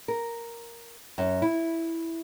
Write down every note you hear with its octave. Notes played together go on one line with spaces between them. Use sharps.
A#4
F#2
E4